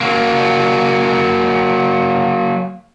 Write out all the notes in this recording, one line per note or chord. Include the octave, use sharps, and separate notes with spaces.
F#3 A#3